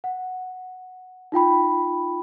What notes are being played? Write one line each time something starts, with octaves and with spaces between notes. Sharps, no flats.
F#5
D#4 F4 G5 B5